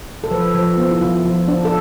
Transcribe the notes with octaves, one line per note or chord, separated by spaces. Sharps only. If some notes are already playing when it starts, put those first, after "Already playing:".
A4
F3 B4
F3
B3
E4
F3 F4
F3
D4
A4